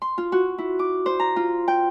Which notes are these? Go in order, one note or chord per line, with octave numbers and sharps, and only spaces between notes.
C6
F4
F#4
E4
D6
C5
A#5
F4
G5